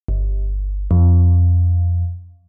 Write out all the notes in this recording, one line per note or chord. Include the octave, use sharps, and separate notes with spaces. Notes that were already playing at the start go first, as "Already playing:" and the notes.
G1
F2